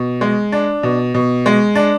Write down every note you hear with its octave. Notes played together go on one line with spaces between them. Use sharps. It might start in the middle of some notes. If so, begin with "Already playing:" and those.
Already playing: B2
G#3
D4
B2
B2
G#3
D4